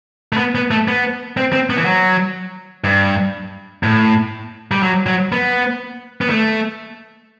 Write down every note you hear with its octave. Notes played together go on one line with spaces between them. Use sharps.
A3
B3
B3
A3
B3
C4
C4
B3
E3
F#3
G2
A2
G3
F#3
F#3
B3
B3
A3